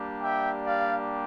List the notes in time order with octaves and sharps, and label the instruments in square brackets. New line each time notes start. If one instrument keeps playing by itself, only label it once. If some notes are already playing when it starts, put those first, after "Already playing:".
Already playing: [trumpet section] G3 A#3 D4 G4
E5 G5
D5 F5